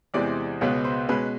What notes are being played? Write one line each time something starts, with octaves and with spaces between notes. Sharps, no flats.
E2 C3 E3 G#3 C4 D5
C#2 B2 G#3 B3 C#5
C5
B2 G#3 C#4 B4